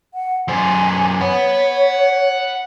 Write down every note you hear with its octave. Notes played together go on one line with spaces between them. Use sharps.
F#5
F#2 C5 G#5
C#5 F#5 B5